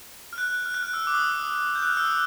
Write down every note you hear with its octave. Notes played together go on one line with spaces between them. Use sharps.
F6
F#6
F6
F#6
F6
E6
D6
D#6
E6
G6
F#6
F6
E6
D#6